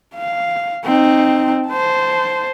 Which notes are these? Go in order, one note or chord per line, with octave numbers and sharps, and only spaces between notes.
F5
C4 D#4
C5 A5